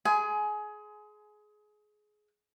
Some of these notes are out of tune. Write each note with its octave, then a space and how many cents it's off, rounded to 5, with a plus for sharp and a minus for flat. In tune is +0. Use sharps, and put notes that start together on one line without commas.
G#4 +25 G#5 +20 C6 -25